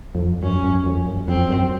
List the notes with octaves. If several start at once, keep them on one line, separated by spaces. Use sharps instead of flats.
F2
F#2 C#4
F#2
F2
F#2
F2 C4
F#2